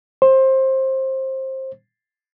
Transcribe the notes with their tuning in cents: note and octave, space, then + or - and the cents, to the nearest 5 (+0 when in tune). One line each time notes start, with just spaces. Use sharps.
C5 +20